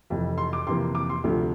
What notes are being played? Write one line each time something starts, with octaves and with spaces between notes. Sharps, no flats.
F1 F2 E3
C6
D6
F2 C3 E3 A#3 C6
D6
C6
D2 C3 F3 A3